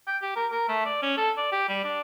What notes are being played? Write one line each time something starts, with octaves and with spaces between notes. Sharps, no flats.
G5
G4
A#4
A#4
A3
D5
C#4
A4
D5
G4
G3
D4